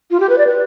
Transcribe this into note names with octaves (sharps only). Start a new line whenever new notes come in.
F4
G4
B4
D5
B4